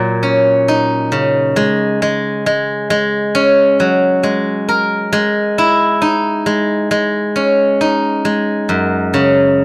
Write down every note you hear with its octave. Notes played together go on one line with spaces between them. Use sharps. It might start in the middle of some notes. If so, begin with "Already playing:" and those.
Already playing: A#2 F#3
C#4
D#4
C#3
G#3
G#3
G#3
G#3
C#4
F#3
G#3
A#4
G#3
E4
D#4
G#3
G#3
C#4
D#4
G#3
F#2
C#3